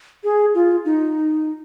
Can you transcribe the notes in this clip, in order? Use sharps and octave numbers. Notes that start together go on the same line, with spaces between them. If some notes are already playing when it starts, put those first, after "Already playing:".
G#4
F4
D#4